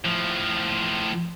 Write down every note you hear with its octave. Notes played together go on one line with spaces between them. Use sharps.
A2 F3